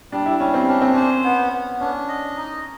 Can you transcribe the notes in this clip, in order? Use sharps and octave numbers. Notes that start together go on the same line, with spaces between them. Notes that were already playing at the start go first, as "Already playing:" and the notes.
G3 D4
E4
G3 C#4
C4
C#4 D4
C4
C#4 C5
B3
B3
C#4 D4
D#5
D#4